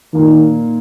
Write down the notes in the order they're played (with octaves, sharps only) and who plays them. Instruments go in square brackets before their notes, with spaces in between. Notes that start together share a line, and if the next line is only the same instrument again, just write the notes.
[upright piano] A#2 A#3 D#4 [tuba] D#3